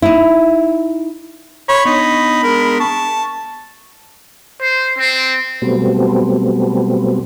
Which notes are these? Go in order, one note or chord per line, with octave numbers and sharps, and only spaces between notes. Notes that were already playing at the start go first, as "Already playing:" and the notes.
D#4 E4
C#5 B5 C6
B3 D4 D#4
G#3 A#4
A5 C#6
C5
C4
B2 F#3 G3 A3 B3 C4